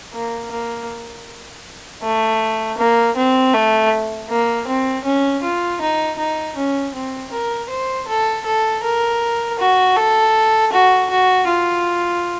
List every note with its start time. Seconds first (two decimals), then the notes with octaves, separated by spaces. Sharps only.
0.13 A#3
0.51 A#3
2.02 A3
2.78 A#3
3.16 C4
3.53 A3
4.29 A#3
4.67 C4
5.05 C#4
5.43 F4
5.81 D#4
6.19 D#4
6.56 C#4
6.94 C4
7.32 A#4
7.69 C5
8.08 A4
8.45 A4
8.83 A#4
9.59 F#4
9.97 A4
10.72 F#4
11.10 F#4
11.48 F4